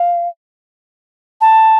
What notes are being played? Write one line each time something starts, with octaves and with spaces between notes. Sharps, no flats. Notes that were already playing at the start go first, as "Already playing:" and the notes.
Already playing: F5
A5